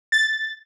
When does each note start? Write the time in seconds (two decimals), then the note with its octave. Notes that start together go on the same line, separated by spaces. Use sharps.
0.12 A6